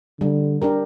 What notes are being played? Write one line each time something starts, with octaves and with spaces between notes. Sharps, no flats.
D3 G3
D4 G4 A#4